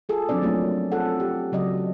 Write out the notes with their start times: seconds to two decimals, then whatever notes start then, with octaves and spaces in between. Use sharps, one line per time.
0.09 F4 G#4 A4
0.29 F3 F#3 C4 D4 D5
0.42 F#3 A3 A#3 C#4
0.92 C4 F4 G#4 A4 F#5
1.20 G4
1.52 C#3 F#3 D5 D#5